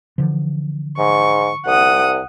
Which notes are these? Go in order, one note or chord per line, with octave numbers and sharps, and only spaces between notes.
D3 E3 F3
G#2 C#6
C2 F#5 D#6